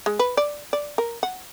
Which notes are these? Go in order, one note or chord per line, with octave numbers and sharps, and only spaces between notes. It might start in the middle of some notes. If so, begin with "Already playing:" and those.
G#3
B4
D5
D5
A#4
F#5